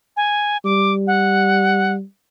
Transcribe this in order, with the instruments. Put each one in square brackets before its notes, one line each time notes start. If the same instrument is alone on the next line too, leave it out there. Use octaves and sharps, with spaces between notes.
[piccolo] G#5
[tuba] G3 [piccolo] D6
[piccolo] F#5